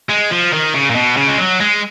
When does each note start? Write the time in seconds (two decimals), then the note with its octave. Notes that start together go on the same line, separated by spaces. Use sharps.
0.09 G#3
0.31 F3
0.53 D#3
0.74 C#3
0.90 A#2
0.95 B2
1.18 C#3
1.28 G#3
1.39 F#3
1.61 G#3